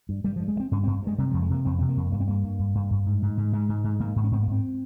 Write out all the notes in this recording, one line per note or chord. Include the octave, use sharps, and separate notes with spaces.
G2
G2 G3
G2 F3
G#3
G2
C4
G2 C#4
G2 C4
G2 G#3
C3 G3
F2 F3
G#3
C3 A#3
F2 C4
C3 C4
A#3
F2
G2 A#3
C4
G2 A#3
G2
G2
G2
G2
G#2
G#2
G#2
G#2 G#3
G#2
G#2
G#2 A#3
G#2
C#4
G#2 C4
A#3
G#2 C4